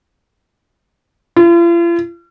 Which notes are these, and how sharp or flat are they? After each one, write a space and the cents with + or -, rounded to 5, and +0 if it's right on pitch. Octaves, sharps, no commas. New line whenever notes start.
F4 -45